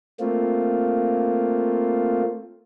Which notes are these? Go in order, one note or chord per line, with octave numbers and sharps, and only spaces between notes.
A3 A#3 C4 F4